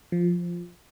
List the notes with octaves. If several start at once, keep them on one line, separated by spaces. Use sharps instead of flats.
F3